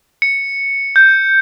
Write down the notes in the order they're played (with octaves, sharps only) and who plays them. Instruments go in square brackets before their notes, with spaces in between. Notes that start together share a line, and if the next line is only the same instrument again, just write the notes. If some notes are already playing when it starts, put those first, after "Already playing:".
[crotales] C#7
G6